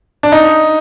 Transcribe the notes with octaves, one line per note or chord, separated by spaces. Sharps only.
D4
D#4